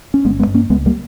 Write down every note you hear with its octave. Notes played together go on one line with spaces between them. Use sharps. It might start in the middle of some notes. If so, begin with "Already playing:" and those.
C#4
G1 G#3 B3
G#3 B3
G2
A#3 C#4
C#2 G#3 B3
G3 A#3